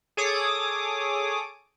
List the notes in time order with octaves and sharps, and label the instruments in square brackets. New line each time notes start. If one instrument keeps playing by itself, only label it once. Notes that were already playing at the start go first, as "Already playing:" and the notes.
[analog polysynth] G#4 A4 C#5 D6 D#6